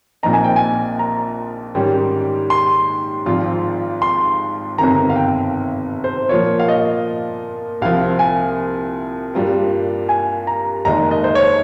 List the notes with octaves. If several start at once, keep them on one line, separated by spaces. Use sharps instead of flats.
A#1 A#2 F3 C4 D#4 A#5
G#5
G5
G#5
A#5
G#2 D#3 G3 C#4 G4
C6
G#1 G#2 F3 C4 F4
C6
G1 F2 C3 D#3 A#5
F5
G5
C5
A#2 F3 A#3 F4 C#5
F5
D#5
C2 C3 F3 C4 F5
G#5
G2 G3 A#3 F4 A#4
G#5
A#5
F1 D#2 D#3 G#3 D#4 A#5
D#5
C5
C#5